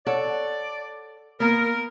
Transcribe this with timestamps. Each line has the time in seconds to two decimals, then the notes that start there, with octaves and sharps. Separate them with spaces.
0.07 A4 C#5 D5 F#5
1.40 A#3 B3 A#4